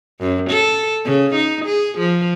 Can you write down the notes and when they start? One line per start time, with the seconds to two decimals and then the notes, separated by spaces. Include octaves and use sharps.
0.21 F#2
0.50 A4
1.05 C#3
1.36 D#4
1.66 G#4
1.99 F3